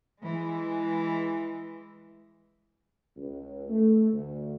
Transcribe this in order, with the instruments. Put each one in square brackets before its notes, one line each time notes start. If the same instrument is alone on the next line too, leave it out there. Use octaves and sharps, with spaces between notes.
[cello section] E3 G#3
[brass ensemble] C#2
A3
D2